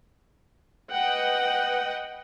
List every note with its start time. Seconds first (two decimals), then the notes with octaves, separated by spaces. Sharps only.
0.92 B4 D#5 F#5 G5